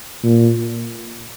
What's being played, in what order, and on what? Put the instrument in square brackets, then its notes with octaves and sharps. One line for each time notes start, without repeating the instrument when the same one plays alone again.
[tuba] A#2